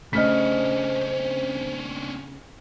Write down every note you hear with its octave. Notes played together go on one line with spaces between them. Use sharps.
C#3 A3 C#4 D4 C5 D#5 F6 B6